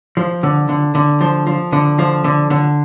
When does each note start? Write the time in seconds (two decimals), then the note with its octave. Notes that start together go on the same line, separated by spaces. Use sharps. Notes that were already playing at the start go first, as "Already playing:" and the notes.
0.17 F3
0.43 D3
0.69 D3
0.95 D3
1.21 F3
1.47 F3
1.73 D3
1.99 F3
2.24 D3
2.50 D3